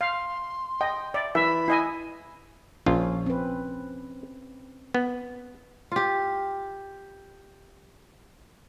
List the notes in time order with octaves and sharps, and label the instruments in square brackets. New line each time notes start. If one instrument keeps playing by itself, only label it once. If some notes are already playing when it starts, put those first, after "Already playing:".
[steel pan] F5 [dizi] C6
[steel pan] D#5 [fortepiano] G5
[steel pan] D5 [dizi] E5
[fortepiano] E3 [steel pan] E5 [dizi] B5
[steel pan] E4 D#5 G#5
[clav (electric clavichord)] A#1 F4 [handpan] C#4
[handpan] C4 B4
[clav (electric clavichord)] B3
[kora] F4 G4